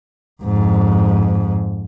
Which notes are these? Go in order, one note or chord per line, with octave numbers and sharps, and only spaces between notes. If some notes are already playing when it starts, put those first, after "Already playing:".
F2 G#2